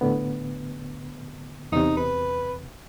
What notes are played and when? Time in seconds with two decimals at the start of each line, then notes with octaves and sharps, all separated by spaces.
0.01 A2 D3 B3
1.72 E2 C3 D#4
1.97 B4